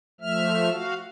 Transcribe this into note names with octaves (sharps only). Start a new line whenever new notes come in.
F3 A3 E5 F6
F#4 F5